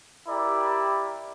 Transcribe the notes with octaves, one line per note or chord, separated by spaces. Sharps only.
E4 G4 A#4 D5